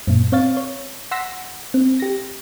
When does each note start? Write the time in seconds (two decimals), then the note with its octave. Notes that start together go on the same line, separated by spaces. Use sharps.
0.07 F#2 A#2
0.32 C4 C#5 F5 A6
0.57 C#5
1.11 F#5 C6 E6 A#6 B6
1.74 C4
2.00 G4 A#6